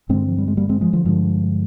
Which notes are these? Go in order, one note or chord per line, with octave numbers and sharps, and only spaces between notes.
G2 D3 G#3 C4
F3
G3
G#3
G3 A#3
G#3 C4
F3 G#3
D3 F3
G2 D3 F3 G#3